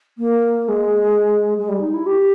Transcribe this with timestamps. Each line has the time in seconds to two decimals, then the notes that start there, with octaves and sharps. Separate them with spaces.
0.18 A#3
0.68 G#3
1.58 G#3
1.69 G3
1.81 D#4
1.94 E4
2.06 G4